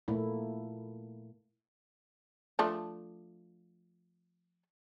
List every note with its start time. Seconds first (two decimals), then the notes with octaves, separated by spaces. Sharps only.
0.08 A#2 A3 A#3 E4
2.59 F3 A3 D4